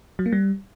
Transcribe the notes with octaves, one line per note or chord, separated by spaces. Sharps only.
F#3
A#3
G3